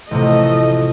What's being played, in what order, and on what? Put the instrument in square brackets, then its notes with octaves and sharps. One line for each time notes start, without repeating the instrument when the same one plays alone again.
[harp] A1 C3 [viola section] F3 A3 D#5